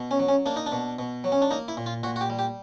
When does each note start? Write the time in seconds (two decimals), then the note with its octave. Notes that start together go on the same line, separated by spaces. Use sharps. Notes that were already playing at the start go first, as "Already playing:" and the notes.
Already playing: B2
0.11 C#4
0.19 F#3
0.28 C#4
0.46 A#3 D4
0.56 D#4
0.66 D4
0.72 B2
0.99 B2
1.24 F#3
1.32 C#4
1.42 D4
1.51 A#3 D#4
1.68 E4
1.77 A#2
1.86 F4
2.03 A#2 F#4
2.16 F#4
2.21 G4
2.30 G3
2.39 G4